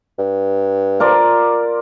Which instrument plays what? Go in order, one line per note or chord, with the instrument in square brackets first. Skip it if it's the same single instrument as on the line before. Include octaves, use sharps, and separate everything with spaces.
[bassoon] G2
[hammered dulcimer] F4 A#4 D5